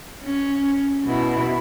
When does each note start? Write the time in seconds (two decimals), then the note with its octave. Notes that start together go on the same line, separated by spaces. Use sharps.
0.23 C#4
1.06 B2 E4